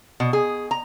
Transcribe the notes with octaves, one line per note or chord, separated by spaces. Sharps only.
B2
G#4
A#5